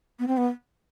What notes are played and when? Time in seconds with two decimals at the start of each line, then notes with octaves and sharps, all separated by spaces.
0.19 B3
0.28 C4
0.37 B3